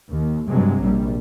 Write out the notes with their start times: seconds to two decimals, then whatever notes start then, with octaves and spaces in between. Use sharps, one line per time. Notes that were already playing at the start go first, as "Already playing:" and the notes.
0.11 D#2
0.47 G2 C3 F#3 G#3
0.81 A#1 G3